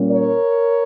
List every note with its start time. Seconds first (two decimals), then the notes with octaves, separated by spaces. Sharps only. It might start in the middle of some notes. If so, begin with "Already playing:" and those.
Already playing: A#2 G3 A#3 C#4
0.09 A#4 C#5